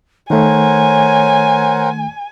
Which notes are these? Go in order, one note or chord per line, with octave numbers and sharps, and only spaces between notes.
D#3 A3 A#4 C5 C#5 F#5 G#5